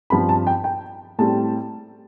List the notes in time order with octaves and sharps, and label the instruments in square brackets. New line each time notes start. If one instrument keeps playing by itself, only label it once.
[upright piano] G2 F3 C4 B5
A5
G5
G5
A2 G3 C4 A5